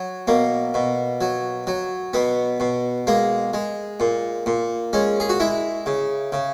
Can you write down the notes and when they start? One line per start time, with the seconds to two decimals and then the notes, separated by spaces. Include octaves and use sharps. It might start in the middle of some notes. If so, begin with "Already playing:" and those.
Already playing: F#3
0.28 B2 A#3
0.74 B2
1.21 F#3
1.67 F#3
2.14 B2 B3
2.60 B2
3.07 G#3 A#3
3.54 G#3
4.00 A#2
4.46 A#2
4.93 G#3 C#4
5.20 G#4
5.29 F#4
5.40 G#3 E4
5.86 C#3
6.32 C#3